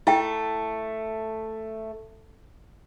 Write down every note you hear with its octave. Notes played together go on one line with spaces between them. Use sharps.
A3 E4 G5